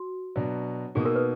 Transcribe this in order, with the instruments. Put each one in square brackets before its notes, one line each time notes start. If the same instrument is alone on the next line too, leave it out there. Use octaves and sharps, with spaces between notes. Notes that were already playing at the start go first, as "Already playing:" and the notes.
Already playing: [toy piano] F#4
[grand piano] B2 F#3 D4
[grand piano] B2 A#3 D#4 [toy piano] G#4
[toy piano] A#4
B4